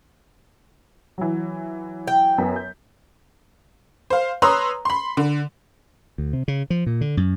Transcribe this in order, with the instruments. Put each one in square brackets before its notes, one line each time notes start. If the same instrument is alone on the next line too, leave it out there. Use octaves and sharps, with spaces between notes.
[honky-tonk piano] E3 F#3
[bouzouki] G5
[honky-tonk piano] F#2 B3 B6
G6
C5 F5
B4 C#5 A#5 C6 D#6 E6
B5 C6
D3
[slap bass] D2
C3
C#3
F3
A#2
D3
F#2